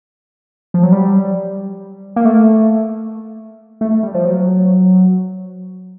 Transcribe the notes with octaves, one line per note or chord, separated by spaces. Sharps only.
F3
F#3
G3
A#3
A3
A3
G3
F3
F#3